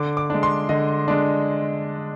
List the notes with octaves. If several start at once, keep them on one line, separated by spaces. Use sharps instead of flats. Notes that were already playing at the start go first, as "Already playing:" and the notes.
Already playing: D3 D6
D6
G#3 D4
C6
D3 D#5
G#3 D4